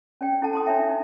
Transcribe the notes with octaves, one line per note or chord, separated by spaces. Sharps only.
C#4 D5 G5
C#4 E4 A4 F#5 A5
A5 C6 D#6
D4 E4 C#5 E5 G5
D4 D#4